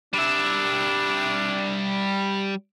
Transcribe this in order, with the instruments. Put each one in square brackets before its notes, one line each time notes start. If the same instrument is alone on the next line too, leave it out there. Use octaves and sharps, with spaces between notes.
[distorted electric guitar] G3 E5 [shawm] D4